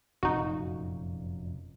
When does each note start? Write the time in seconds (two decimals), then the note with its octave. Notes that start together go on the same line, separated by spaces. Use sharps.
0.23 F1 F#2 A#2 D#4 F#4